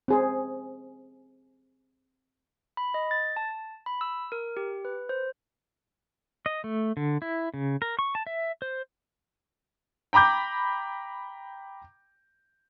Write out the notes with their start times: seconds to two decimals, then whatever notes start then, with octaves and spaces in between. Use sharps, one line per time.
0.08 C4 G#4 C5
2.77 B5
2.94 D#5
3.11 A6
3.36 A5
3.86 B5
4.01 E6
4.32 A#4
4.57 G4
4.85 B4
5.09 C5
6.46 D#5
6.64 A3
6.97 D3
7.22 E4
7.54 C#3
7.82 A#4
7.99 C#6
8.15 A5
8.27 E5
8.62 C5
10.13 G5 A#5 B5 D6 G6